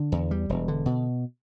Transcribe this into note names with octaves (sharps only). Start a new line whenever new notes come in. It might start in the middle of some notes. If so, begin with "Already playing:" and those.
Already playing: D3
E2
G3
E1
D3
B2